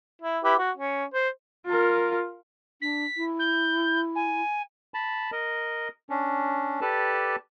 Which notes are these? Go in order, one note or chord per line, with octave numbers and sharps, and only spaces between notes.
E4
E4 G4 B4
F#4
C#4
C5
F4 A#4
D4 B6
E4
G6
G#5
A5 B5
A#4 D#5
C#4 D4
G4 A4 B4 D5 A5